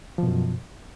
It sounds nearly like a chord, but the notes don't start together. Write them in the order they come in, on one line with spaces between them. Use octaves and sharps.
F3 B2 F#2